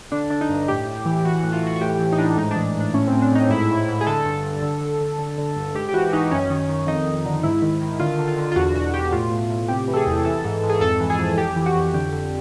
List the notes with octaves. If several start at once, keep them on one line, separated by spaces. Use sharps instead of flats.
D3 D4
D3 D4
D#4
G2
A2 G4
A2
E3
E3 F#4
A2
F4
E3 F#4
F#4
A2 G4
E3
D#4
A2 D4
G#2 D#4
D4
E3
D4
G#2
D4
A2 C#4
A2 C4
D4
A2 D#4
G#2 E4
G#2
G#2
G#4
D3 A4
G2
G2
D3
D3
D3
D3
D3
G2
G#2 G4
G4
E3 F#4
E3 D#4
F#2 C#4
D#3
D#3
F2 D#4
F2
D3
G#2 E4
D#3
D#3
D3 F4
D3
F4
D3
F4
E2 F#4
B2 F#4
B2 G4
A2 F4
A2
A2
C3 G4
E3
A4
G#4
E2
E3 A4
G#2
G#2
G#4
F2 A4
E3
G#4
F2
F2 G4
E3
F#4
F2
D3 G4
D3